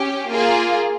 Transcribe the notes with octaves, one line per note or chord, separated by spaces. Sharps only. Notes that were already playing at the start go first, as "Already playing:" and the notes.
Already playing: C#4 G4
A#3 F4 G#4